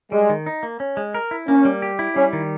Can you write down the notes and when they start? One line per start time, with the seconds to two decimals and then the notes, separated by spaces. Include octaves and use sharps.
0.12 G3 G#3
0.30 D#3
0.46 D#4
0.63 A#3
0.80 C#4
0.97 G#3
1.14 A#4
1.31 E4
1.48 A#3 C#4
1.65 G3
1.82 G4
1.99 E4
2.16 G3 C#4
2.33 D#3